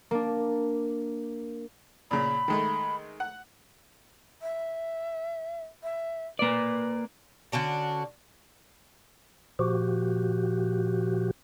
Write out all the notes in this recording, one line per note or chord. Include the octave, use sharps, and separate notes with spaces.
A#3 D4
A#2 C#3 B5
D#3 G#3 A3
F#5
E5
E5
A#3 B4 D5
D3 C#4 D4 F#4
A#2 F3 F#4 G4